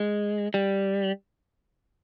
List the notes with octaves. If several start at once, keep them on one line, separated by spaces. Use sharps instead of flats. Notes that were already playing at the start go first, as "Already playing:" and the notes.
Already playing: G#3
G3